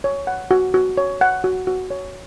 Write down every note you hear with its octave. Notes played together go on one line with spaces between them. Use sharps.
C#5
F#5
F#4
F#4
C#5
F#5
F#4
F#4
C#5